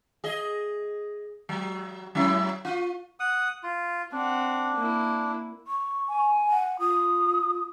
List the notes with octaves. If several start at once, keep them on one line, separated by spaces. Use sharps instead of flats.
G#4 D#5
F#3
F#3 C#4 E4
F4
F#5 D#6
F4
C4 D4 F#5
A#3 E4
C#6
G#5
F#5
F4 D#6